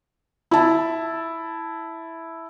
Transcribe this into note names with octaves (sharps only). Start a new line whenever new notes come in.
E4 A5